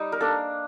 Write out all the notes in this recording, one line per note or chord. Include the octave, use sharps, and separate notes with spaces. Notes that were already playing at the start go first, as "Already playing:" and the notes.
Already playing: G3 D#4
A#4
A#3 D4 A4